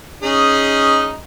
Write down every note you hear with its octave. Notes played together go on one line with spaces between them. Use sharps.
C#4 D#4 G#4